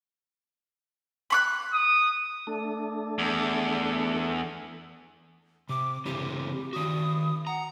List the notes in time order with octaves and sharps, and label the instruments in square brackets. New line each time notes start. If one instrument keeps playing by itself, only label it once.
[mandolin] B5 C#6 F#6
[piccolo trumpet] D#6
[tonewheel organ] A3 D4 A4
[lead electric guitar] E2
[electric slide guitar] C3 [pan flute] D6
[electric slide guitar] C#3 E3 C4 [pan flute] G4
[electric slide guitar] D#3 F#4 [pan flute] D#6
[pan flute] F#5 [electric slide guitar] A#5